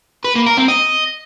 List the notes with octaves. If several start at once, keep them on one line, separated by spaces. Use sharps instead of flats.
B4
A#3
A#4
C4
D#5